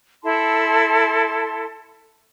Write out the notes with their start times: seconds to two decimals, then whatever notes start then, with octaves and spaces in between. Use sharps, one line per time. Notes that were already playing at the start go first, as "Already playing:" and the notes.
0.24 E4 A4 A5 C6